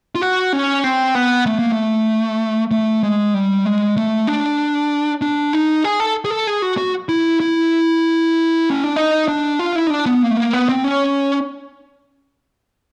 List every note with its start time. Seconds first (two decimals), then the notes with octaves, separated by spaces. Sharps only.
0.15 F4
0.21 F#4
0.53 C#4
0.84 C4
1.15 B3
1.46 A3
1.59 A#3
1.72 A3
2.71 A3
3.03 G#3
3.34 G3
3.65 G#3
3.97 A3
4.27 D4
5.22 D4
5.53 D#4
5.84 G#4
6.00 A4
6.25 G#4
6.30 A4
6.47 G#4
6.62 F#4
6.78 F#4
7.09 E4
7.40 E4
8.70 C#4
8.84 D4
8.96 D#4
9.28 D4
9.59 F4
9.75 E4
9.87 D#4
9.90 D4
10.06 B3
10.22 A#3
10.31 A3
10.37 A#3
10.53 B3
10.69 C4
10.84 C#4